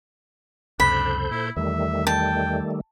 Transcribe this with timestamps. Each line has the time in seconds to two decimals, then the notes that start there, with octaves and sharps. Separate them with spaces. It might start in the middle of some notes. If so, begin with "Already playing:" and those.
0.80 C#2 F#2 C3 D4 A4 C5 B5 G6
1.31 A#2 E4
1.57 E2 D#3 G3 A3 E5
2.07 G5 A5